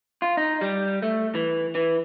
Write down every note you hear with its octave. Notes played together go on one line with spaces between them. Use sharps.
F4
D#4
G3
A3
E3
E3